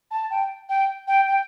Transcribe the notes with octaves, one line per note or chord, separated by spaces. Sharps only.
A5
G5
G5
G5
G5